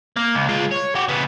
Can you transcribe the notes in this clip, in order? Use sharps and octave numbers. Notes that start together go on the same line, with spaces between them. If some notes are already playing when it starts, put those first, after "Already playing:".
A#3
C#2
G#3 F4
C#5
F#4 G4
C#3 B3